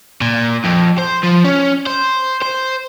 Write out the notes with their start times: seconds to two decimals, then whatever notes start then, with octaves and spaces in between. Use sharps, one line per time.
0.21 A#2
0.64 F2
0.98 C5
1.23 F3
1.44 C#4
1.87 C5
2.42 C5